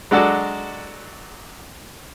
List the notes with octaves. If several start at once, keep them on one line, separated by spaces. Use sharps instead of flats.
F#3 G#3 D4 F#4 A4 D5